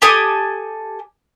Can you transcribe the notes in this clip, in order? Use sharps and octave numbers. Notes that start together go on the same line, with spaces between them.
G4 A4 G#5 D#6